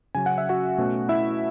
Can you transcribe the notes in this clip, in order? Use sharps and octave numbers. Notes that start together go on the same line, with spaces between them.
C#3 F#3 C#4 G#5
F#5
E5
F#4 F#5
B2 A3 C#4
E4 E5